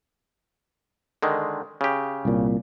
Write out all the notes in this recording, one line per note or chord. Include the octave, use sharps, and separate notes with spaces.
D3 D#3 G#3
C#3 G4
C2 A#2